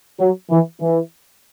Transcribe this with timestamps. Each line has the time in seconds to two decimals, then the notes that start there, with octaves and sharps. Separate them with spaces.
0.20 F#3
0.51 E3
0.81 E3